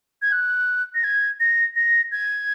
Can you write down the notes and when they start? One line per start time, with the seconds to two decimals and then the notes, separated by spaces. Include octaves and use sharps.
0.22 G#6
0.32 F#6
0.95 A#6
1.04 G#6
1.40 A#6
1.76 A#6
2.12 G#6